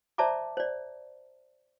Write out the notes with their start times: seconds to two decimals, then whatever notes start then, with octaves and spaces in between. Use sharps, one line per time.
0.18 C5 D5 E5 A5 A#5 D6
0.57 C5 D5